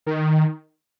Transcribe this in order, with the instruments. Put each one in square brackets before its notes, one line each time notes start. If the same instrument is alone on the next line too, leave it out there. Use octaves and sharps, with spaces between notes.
[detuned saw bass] D#3